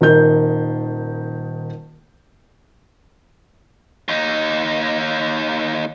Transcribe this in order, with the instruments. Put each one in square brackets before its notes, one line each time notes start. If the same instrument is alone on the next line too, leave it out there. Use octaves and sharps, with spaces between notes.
[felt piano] D#1 D#3 A#4 G6
[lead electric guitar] D#2 D#4